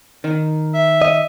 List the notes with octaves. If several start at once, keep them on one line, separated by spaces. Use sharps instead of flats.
D#3
E5
D#5